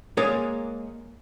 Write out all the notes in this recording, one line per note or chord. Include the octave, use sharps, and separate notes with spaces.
G#3 A#3 G#4 A#4 C#5 D5